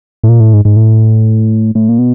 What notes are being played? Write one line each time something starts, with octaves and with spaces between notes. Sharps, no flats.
A2
A#2
A2
G#2
G#2
A2
A2
A#2
B2